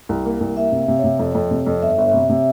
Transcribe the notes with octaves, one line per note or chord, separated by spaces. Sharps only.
C2
A#3
C2
A#3 E5
C3
F5
C3
C#5
C3
F2
F2
C3
F2
G1 E5
G1
C3
C3